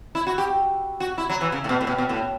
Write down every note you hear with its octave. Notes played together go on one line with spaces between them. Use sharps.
E4
F#4
G4
F#4
E4
F#3
E3
C#3
A2
B2
A2
B2
B2
A2